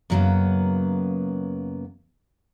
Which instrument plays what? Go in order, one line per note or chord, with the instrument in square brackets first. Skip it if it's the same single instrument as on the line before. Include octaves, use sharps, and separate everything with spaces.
[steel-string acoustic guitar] F#2 C#3 F#3 G#3 A#3 B3